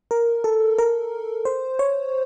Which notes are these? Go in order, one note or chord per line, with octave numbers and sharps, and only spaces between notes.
A#4
A4
A#4
C5
C#5